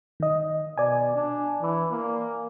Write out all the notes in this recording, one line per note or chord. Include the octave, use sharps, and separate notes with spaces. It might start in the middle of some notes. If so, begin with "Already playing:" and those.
D#3 D#5
B2 D5 G#5
D4
E3
A#3